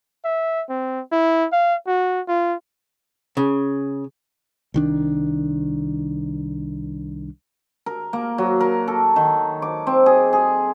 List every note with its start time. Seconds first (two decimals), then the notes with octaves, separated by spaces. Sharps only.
0.24 E5
0.69 C4
1.12 E4
1.52 F5
1.87 F#4
2.28 F4
3.37 C#3
4.74 C2 D#3 D4
7.86 A#4
8.13 A#3
8.38 F#3
8.60 A#4
8.88 A4
9.16 D#3
9.62 D6
9.87 C4
10.06 G#4
10.33 G#4